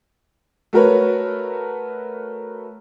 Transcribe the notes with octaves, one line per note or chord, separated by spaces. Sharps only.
A3 F#4 A#4 B4 C#5